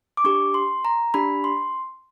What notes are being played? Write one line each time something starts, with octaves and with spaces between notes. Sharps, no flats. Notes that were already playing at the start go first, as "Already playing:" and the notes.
D6
D4 G4 C#6
C6
A#5
D4 G4 B5
C6